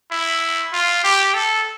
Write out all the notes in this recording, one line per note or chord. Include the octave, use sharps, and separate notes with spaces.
E4
F4
G4
A4